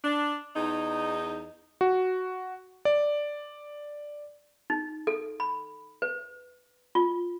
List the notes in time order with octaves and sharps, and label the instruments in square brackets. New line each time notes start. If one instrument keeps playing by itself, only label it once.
[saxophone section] D4
E2 D#4
[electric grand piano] F#4
D5
[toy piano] D#4
A4
B5
B4
F4